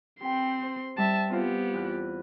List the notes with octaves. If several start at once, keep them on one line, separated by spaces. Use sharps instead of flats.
C4 G4 B4 G5 C6
C5
G3 E5 A5
B3 C4 F4 G4 C5
E2 F#6